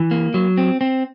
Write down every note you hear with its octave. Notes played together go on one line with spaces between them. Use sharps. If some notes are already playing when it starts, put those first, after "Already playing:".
Already playing: E3
A#3
F#3
C4
C4